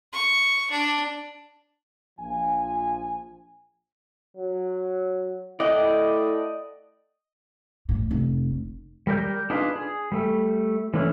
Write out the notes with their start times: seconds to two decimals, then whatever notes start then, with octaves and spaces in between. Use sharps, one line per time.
0.13 C#6
0.71 D4
2.20 A#1 F3 G#5
4.37 F#3
5.60 A3 E4 D5 D#5 F#5 G5
7.89 A2
8.11 F1
9.07 G3 A#4 D5 G6
9.50 D4 D#4 F4 G#4 B4
9.76 G#4
10.12 G3 A3
10.94 E3 A3 C#4 D4 E4